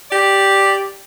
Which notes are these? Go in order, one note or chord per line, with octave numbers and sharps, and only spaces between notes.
G4 D5